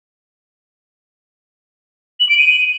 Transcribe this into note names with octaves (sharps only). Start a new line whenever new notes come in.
F#7
D7
D#7